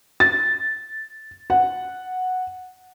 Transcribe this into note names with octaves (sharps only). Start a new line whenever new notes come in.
A6
F#5